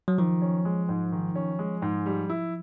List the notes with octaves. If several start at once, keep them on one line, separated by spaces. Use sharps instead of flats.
F#3
D#3 F3
C#4
G#3
G#2
D#3
C#4
G#3
G#2
G3
E4